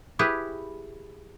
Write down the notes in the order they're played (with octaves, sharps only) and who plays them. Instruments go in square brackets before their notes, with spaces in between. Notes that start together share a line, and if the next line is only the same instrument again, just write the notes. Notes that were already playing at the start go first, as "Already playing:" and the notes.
[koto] E4 G4 G#4 B4